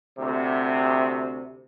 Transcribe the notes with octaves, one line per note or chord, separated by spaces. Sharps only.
D2 C3